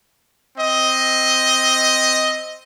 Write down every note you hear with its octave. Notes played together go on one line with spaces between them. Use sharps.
C4 D#5